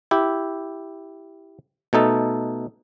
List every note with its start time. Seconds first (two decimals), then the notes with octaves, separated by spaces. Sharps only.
0.11 E4 G4
1.93 B2 A3 D#4 A4